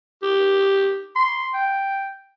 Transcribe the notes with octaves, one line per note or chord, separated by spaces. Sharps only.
G4
C6
G5